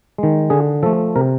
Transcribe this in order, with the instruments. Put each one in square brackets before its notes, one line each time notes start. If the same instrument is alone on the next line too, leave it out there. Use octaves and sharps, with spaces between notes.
[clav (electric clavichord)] D#3 G#3
D3 G#4
F3 A3 A4
C3 A#4